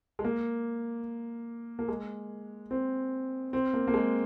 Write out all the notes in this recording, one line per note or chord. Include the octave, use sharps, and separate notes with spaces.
G#3
A#3
A#3
G#3
C4
C4
A#3
A#3
G#3